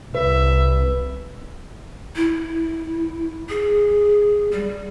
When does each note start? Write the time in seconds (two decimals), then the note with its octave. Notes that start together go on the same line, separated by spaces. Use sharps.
0.15 C2 B4 E5
2.16 E4
3.49 G#4
4.52 G3